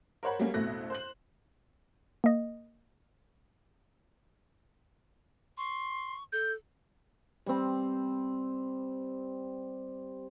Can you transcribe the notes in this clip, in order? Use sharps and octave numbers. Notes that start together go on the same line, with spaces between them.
A#4 C5 C#5 F#5 B5
F#3 G3 A3 A#3 C#4 F#4
A1 F2 B2 A3 F#6 A#6
C5 F#6 F#7
A#3 D#5
C6 C#6
A4 G6
G3 C4